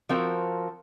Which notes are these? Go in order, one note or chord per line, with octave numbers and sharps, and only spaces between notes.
F3 C4 F#4 A#4